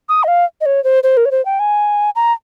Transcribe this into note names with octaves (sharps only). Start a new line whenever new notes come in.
D#6
D#5
F5
D#5
C#5
C5
C5
A#4
C#5
C5
G5
G#5
A#5